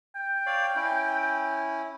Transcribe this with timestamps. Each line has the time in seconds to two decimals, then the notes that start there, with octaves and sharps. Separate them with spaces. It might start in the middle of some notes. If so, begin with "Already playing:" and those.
0.16 G5
0.46 C#5 D5 F5
0.76 C#4 E4